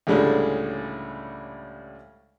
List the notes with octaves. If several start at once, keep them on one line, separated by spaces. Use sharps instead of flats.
C#2 A2 D3 G3 G#3